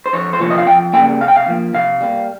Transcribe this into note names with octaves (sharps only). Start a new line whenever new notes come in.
C5
F2 C#5
C5
C3 F3 A#3 C#5
D#5
F5
F2 G5
C#3 G3 A#3 G5
C3 F5
G5
F5
F3 A#3
C3 F5
G3 A#3